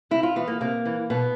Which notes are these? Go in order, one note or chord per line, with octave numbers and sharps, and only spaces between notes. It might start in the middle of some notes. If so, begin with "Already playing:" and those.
C3 E4
F4
E3 B3
A#3
C3 A#3
E3
B2 B3